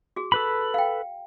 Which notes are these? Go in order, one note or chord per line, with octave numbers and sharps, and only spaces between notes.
F#4 G#4
A4 B4 B5
F5 G5